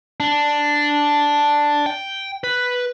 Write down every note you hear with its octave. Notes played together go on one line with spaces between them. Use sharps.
D4
G5
B4